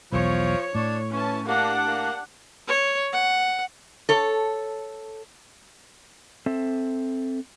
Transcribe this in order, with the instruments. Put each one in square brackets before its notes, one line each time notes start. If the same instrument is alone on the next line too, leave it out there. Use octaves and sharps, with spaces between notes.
[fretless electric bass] B1 E2 [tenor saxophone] F3 [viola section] C#5
[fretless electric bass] A2 [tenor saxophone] D4
[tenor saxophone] E3 [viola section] C#4 A5
[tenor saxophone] A#3 [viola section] D4 G4 F#5
[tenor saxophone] A#3
[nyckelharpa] C#5
F#5
[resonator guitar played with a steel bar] A4 C#5
[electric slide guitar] C4 A4 E5